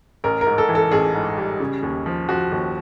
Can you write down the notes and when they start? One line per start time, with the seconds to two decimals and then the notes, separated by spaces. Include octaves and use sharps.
0.24 A1 A#4
0.41 A#4
0.47 G#2
0.58 A4
0.69 E3
0.75 A4
0.91 A1 G#4
1.14 G#2
1.38 G3
1.60 C#3
1.83 D#2
2.06 F3
2.29 F3 F#4
2.52 D#2